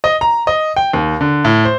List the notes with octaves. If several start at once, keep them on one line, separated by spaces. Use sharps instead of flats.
D#5
A#5
D#5
G5
D#2
D3
A2
C5